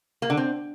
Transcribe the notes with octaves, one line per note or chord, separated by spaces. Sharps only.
A#3
D3
C4